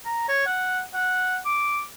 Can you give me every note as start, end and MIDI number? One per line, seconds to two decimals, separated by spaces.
0.05 0.25 82
0.29 0.43 73
0.46 0.80 78
0.94 1.37 78
1.45 1.81 86